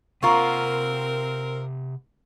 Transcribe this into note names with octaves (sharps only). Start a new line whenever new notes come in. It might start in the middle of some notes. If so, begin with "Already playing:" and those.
C3 A#3 C4 F4 A#4 F#5 A#5 C#6